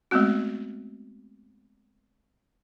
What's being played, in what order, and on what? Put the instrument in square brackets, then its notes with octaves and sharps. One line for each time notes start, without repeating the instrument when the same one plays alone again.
[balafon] G#3 A3 B3 C4 F#4